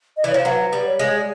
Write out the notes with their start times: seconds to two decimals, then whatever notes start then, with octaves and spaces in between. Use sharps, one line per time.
0.17 D#5
0.24 E3 D5
0.31 C#5
0.34 F3 C5
0.45 F#3 B4
0.73 G3
0.86 C#5
0.99 G#3
1.17 D5